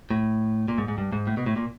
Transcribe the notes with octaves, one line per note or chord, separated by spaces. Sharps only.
A2
A#2
G#2
G#2
G2
G#2
A2
B2
A2
A#2